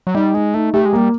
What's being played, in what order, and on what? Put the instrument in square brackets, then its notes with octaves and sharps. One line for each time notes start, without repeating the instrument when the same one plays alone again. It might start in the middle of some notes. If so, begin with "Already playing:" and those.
[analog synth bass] F#3
[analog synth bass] G3 [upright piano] D#4
[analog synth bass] G#3 [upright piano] D#4
[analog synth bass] A3 [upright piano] D#4
[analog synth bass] A3 [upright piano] G4
[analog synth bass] G#3
[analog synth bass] G3 [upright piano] A#3